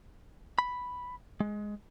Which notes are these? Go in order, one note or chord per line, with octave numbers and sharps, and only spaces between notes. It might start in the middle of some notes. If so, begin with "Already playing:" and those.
B5
G#3